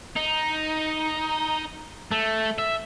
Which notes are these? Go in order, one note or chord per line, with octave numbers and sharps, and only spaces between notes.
D#4
A3
E5